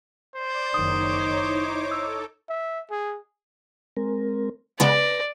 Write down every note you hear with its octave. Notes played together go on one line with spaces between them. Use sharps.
C5 D5
F#1 D#3 D#4 C#5 D6 D#6
E4
A4 E6
E5
G#4
G#3 C4 A#4
C#3 G#3 B3 B4 D5 A#6